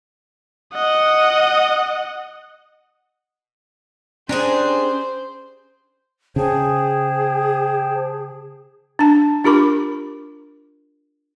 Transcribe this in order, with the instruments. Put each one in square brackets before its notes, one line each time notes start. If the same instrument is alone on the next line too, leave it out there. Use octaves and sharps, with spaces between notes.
[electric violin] D#5 F#5
[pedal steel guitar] C#4 A#5 [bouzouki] D4 G4 G#4 [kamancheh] C5
[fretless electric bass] C#3 [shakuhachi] G#4 [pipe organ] C5 G5 A5
[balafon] D4 A5
D4 F4 G4 A#4 B5 D6